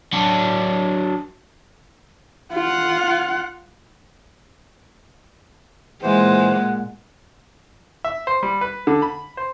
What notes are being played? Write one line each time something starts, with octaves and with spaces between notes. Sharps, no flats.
F#3 D4
F4 F#5
A#2 E3 G#3 C5 F#5
E5
C5
G3
B4
D3
B5
C5